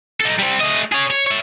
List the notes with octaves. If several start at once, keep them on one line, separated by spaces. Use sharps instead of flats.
D#4 A4
G3 C4
A3 D#5
G#4 C#5
C#5
C#5 E5